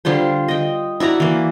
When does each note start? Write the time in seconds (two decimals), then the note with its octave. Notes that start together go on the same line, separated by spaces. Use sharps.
0.05 D3 G3 F4 C5
0.48 D#5 G5
1.00 E4 F#4 D5 A#5
1.20 E3 A#3